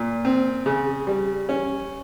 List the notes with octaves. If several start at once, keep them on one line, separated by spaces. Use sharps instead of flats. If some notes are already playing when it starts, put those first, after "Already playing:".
Already playing: A#2
C4
C#3
G3
C#4